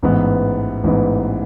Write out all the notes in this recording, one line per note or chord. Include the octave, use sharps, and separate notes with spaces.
A1 G#2 E3 B3
A1 G#2 E3 B3